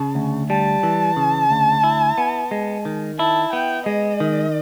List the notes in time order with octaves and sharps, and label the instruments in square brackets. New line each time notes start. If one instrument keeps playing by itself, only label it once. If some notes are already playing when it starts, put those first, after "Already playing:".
Already playing: [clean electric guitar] C#3 [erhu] A5
[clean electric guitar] D2
[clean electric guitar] G3 [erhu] A5
[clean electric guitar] E3
C#3
D2
E4
B3
G#3
D#3
[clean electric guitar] E4 [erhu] A5
[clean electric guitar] B3 [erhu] G5
[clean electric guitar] G#3 [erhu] D#5
[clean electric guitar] D#3